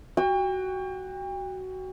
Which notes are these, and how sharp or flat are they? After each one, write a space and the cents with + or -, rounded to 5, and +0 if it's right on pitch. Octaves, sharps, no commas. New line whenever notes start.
F#4 +15 G5 +35